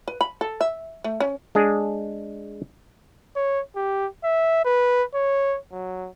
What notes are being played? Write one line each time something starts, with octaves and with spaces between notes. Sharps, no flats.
B4
B5
A4
E5
A3
C#4
G#3 D4 G#4
C#5
G4
E5
B4
C#5
F#3